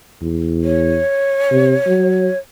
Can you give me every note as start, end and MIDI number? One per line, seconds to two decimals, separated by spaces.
0.22 1.00 40
0.64 2.38 73
1.51 1.75 48
1.87 2.29 54